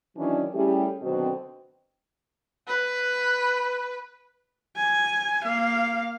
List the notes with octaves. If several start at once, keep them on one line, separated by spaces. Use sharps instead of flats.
D#3 E3 F#3 C#4 D4
G3 A3 C#4 E4 G4 G#4
B2 D3 D#3 F#3 C4
B4
G#5
A#3 F5